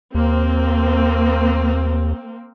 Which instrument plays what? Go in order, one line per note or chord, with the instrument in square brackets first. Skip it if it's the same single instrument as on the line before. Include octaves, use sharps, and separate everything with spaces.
[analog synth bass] D#2 [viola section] A#3 C4